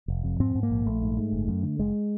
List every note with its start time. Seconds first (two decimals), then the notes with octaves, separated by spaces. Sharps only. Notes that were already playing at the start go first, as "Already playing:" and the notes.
0.08 F1
0.24 F2
0.40 G#2 C4
0.55 G#2
0.63 A#3
0.70 A#1
0.86 A#1 A3
1.02 G#2
1.17 G#2
1.33 F#1
1.48 F#2
1.63 D3
1.79 F#1 G#3